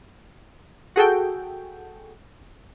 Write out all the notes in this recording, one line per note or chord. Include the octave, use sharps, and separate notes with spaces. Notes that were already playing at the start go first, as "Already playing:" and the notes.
F#4 G#4 A4 G5